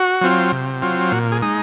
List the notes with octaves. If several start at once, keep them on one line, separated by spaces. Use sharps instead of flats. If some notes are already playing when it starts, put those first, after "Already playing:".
Already playing: F#4
F#3 C4 F4
C3
F#3 C4 F4
A#2 F#4
G#4
G#3 D#4